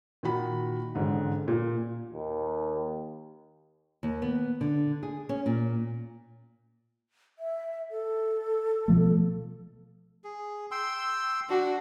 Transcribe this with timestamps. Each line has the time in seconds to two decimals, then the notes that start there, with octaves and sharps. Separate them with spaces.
0.23 A#2 D#3 F#4 B5
0.95 A1 G#2 D3
1.48 A#2
2.13 D#2
4.03 D#2
4.22 B3
4.61 D3
5.03 G#4
5.29 C#4
5.46 A#2
7.39 E5
7.91 A4
8.88 B2 F3 A3
10.24 G#4
10.71 G5 C6 E6
11.49 D4 F#4